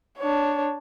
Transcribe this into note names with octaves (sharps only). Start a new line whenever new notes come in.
D4 C#5